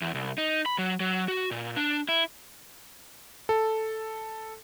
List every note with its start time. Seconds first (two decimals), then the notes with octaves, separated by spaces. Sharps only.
0.02 E2
0.15 C2
0.38 D#4
0.66 B5
0.78 F#3
1.00 F#3
1.28 F#4
1.51 A#2
1.76 D4
2.09 E4
3.49 A4